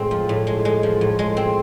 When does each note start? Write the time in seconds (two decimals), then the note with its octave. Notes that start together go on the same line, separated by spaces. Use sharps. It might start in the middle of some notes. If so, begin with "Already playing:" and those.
Already playing: A2 G#3 C4
0.11 F3
0.29 A2
0.47 G#3
0.65 G#3
0.83 F3
1.01 A2
1.19 G#3
1.37 C4